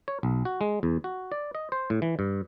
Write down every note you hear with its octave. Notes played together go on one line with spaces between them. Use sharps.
C#5
B1
F#4
G#3
E2
F#4
D5
D#5
C5
A2
E3
G2